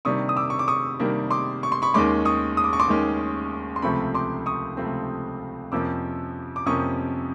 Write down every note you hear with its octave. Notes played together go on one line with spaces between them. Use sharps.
C3 D#3 G3 A#3 D4 C#6 D#6
D#6
D6 E6
C#6
D6
C#6 D#6
C3 D#3 G3 A#3 D4
C6 D6
C#6
C6
B5 C#6
D#2 D#3 G#3 C#4 C6 D6
C#6 D#6
D#6
D6
C#6
C6 D6
D#2 D#3 G#3 C#4
C6
C#2 C3 F3 A3 C4 B5 C#6
C6 D6
C#6 D#6
C#2 C3 F3 A3 C4
F2 C3 F3 A#3 C#4 D6 E6
D6
F2 C3 F3 A#3 C#4 C#6 D#6